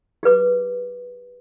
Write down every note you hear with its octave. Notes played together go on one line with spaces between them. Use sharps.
G4 G#4 B4 D6